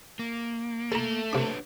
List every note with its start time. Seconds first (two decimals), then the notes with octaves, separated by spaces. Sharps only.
0.19 A#3
0.92 A3 A4 A#5
1.33 C3 D4 B4 C#5 D6